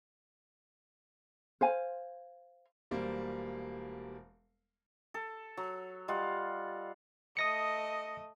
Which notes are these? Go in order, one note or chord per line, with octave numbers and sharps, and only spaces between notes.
C5 F5 G#5
E1 G3 A#3 C5
A4
F#3
G3 F4 D#5 F#5
A3 D#5 D#6 A#6 C#7